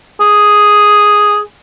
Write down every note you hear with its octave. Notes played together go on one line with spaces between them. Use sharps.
G#4